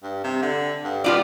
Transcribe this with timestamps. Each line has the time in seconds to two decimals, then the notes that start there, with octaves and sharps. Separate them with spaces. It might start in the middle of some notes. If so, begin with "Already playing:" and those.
0.03 G2
0.24 C3
0.42 D3
0.84 G2
1.04 B2 G3 F4 D5